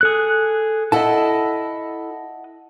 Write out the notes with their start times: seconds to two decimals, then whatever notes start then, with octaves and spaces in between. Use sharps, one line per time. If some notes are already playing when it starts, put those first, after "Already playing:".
0.01 G#4 A4 F#6
0.92 E4 A4 D#5 F#5 A5